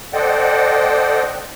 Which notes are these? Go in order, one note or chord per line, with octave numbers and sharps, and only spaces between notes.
A4 C5 D5 D#5 F#5 G5